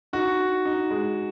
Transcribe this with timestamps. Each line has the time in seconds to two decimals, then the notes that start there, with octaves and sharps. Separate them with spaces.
0.13 D#4 F#4
0.39 D#4
0.65 D#4
0.91 G#3